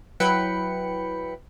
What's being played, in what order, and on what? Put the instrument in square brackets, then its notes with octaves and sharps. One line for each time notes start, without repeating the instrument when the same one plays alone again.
[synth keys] F#3 E4 B4 G5 B5 C#7